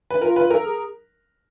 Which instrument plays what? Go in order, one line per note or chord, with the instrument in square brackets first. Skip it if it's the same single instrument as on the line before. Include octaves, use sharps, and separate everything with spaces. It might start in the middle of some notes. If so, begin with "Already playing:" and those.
[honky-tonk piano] B4
[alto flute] F4 [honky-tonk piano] A#4
[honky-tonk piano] B4
[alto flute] A4 [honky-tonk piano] A#4
[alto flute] G#4